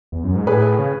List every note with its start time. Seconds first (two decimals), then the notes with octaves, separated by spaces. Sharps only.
0.12 E2
0.24 F#2
0.36 G#2
0.47 A2 G#4 B4
0.79 C#3